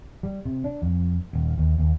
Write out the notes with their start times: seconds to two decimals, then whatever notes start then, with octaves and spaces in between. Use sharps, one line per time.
0.23 G3
0.45 C3
0.64 D4
0.82 F2
1.33 D#1
1.58 D#2
1.78 D#2